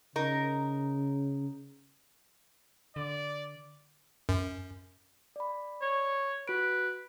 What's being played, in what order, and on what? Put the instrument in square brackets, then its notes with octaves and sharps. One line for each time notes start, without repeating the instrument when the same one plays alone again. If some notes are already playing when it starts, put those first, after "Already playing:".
[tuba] C#3 [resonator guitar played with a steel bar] D#4 A#4
[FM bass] D3 [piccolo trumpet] D5
[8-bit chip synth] F#2
[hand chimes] D5 B5
[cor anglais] C#5
[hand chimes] F#4 D7 [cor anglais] B4